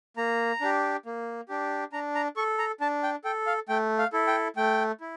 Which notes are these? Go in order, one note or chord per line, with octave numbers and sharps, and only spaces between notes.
A#3 A#5
D4 G4
A#3
D4 G4
D4 A#5
A#5
A4 C#6
A#5
D4 A5
G5
A4 G5
F5
A3 G5
F5
E4 A4
G5
A3 G5
E4